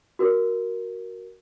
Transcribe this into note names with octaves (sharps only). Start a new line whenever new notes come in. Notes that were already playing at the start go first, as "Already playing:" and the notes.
F#4 A#4